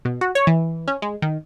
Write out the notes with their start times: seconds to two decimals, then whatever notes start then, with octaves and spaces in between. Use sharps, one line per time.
0.05 B2
0.21 F#4
0.35 C#5
0.47 E3
0.88 C#4
1.02 G#3
1.22 D#3